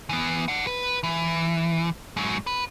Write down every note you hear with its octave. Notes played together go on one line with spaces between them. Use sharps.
E3 B3
D5 F#5
B4
E3
G#2 F#3
B4